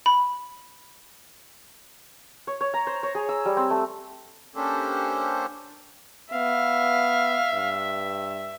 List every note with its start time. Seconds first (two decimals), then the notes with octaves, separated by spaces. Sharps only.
0.06 B5
2.47 C#5
2.61 C#5
2.74 A#5
2.87 C5
3.03 C#5
3.15 G#4
3.29 E6
3.45 G3
3.57 C4
3.70 A3
4.55 A#3 C#4 D4 G4 A4 C5
6.32 B3 E5 F5
7.53 G2